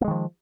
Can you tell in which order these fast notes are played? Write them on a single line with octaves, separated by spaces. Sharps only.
A#3 G#3 D#3 F3